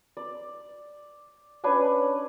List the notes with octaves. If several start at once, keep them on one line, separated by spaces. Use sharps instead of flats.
D5
C#4 D4 B4 C#5